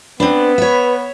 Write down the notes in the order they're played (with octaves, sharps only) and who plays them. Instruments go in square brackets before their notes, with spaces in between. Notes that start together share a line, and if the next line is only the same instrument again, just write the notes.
[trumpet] B3 [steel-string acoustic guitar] C4 D4 [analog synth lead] B4
[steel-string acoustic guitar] C#5 E5